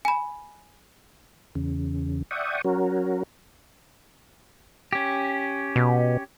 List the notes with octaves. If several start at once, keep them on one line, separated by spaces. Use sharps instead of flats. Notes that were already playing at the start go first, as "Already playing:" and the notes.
G#5 B5
E2 C#3
D5 E5 F#5 G5 C#6 D#6
F#3 C#4 F#4 A#4
C#4 G4
B2